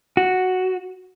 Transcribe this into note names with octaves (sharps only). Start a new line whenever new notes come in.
F#4